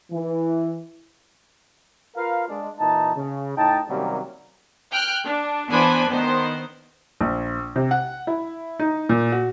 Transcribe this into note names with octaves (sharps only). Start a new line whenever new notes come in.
E3
F4 A#4 B4 F5
G#3 D4
A#2 E3 D#4 A5
C#3
A2 D#4 G5 A5
C3 D#3 F#3 G3 A#3 C#4
G5 F6 F#6
D4
E3 B3 D4 C5 G#5 B5
D#3 B3 C5
A#1
C3
F#5
E4
D#4
A#2
F#4